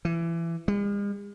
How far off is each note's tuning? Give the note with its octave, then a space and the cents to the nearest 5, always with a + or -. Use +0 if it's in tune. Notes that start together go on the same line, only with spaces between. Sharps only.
E3 +25
G#3 -45